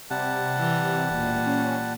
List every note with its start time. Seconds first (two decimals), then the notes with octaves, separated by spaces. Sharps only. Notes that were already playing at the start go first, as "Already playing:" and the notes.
0.10 C3 G3 F#5 A5
0.57 E3
1.10 E1 A#2
1.47 C#4